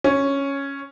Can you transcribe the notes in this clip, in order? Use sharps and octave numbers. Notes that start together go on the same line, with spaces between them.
C#4